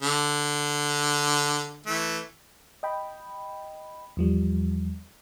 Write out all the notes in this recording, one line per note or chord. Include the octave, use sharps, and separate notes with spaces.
D3
E3 A3
D#5 G5 B5
E2 F3 G3